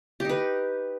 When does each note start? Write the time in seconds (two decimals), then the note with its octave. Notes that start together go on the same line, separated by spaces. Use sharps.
0.20 G4
0.25 D#4
0.29 B4